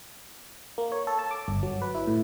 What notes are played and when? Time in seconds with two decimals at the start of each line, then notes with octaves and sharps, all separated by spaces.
0.78 A#3
0.92 C#5
1.07 A4
1.19 A5
1.31 D6
1.48 G1
1.63 F#3
1.82 B4
1.95 E4
2.07 A2